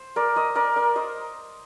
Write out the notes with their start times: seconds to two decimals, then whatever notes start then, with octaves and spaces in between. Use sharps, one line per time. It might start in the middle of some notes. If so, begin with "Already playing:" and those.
Already playing: C5
0.16 A#4 D5
0.36 C5 D#5
0.55 A#4 D5
0.76 A#4 D5
0.96 C5 D#5